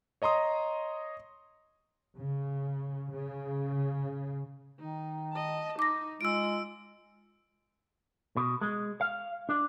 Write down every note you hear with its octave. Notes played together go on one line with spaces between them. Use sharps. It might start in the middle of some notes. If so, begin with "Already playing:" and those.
C#5 D#5 A#5 C6 D#6
C#3
C#3
D#3 D#4
D#5 A5
D#4 D6 A#6
G#3 F4 E6 D7
B2
G#3
F5
D4